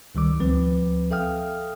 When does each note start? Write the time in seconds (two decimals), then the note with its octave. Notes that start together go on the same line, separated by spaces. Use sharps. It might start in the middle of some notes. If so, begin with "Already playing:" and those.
0.15 C#2 D#3 G3 D6
0.39 D2 F3 C4 B4
1.11 A4 E5 F5 G5 D#6 F6